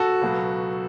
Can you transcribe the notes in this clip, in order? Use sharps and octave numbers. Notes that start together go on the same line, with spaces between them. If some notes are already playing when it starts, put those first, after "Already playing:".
Already playing: F#4 A4
C#2 B2 F#3